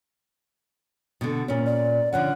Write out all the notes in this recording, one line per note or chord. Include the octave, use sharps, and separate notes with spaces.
B2 D3
A#2 C#4
D5
D3 F3 C#4 F#5